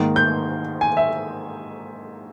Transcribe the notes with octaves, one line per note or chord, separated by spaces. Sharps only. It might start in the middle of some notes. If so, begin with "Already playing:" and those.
Already playing: G#2 D#3 A#3
G6
G#5
E5